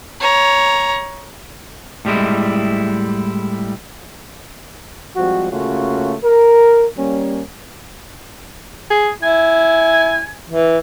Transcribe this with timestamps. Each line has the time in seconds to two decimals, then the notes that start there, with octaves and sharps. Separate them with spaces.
0.21 C#5 A#5
2.05 A2 G3 G#3 E4
5.16 F3 G3 G#3 C4 F#4
5.52 C#3 A3 A#3 C#4 F4 F#4
6.24 A#4
6.97 G3 A#3 C#4
8.90 G#4
9.23 E4 G#5
10.50 E3